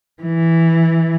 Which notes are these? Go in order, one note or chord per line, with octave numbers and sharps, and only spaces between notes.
E3